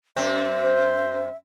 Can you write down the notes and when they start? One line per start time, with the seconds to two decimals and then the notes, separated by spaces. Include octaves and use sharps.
0.16 F#2 C4 E5
0.62 C5